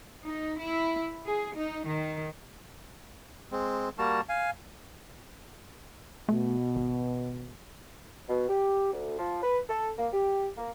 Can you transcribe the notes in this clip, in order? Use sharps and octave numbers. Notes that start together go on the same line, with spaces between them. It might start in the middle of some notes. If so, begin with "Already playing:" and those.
D#4
E4
G#4
D#4
D#3
G#3 C4
G3 A#3 F#4 A5
F5 G#5
B2 A3
G#1
B2
G4
D2
F3
B4
A4
A#3
G4
A#3